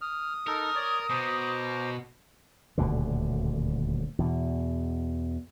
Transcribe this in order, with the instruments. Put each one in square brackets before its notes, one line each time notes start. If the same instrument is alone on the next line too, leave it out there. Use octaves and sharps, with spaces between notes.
[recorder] D#6 [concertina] F6
[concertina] D#4 A4 [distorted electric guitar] A#4
[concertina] C#5 D5
[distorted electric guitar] B2 [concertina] C5 A#5 D6
[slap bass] D#1 D2 B2 D3
E2 B2